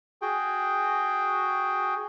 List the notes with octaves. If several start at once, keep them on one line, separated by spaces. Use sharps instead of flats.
F#4 G#4 G5